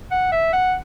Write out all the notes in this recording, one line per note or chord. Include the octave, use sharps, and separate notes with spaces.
F#5
E5
F#5